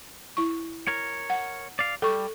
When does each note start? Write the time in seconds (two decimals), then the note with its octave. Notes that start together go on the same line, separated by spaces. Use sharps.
0.37 E4 C#6
0.88 A#4 C#5
1.30 F#5
1.79 D5 F5
2.02 G3 A4 C#6